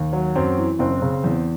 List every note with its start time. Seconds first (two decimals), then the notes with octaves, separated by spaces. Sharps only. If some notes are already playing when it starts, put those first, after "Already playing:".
Already playing: D#2
0.13 F#3
0.36 F#2 C4
0.58 E3
0.79 F#1 C4
1.02 C#3
1.24 E2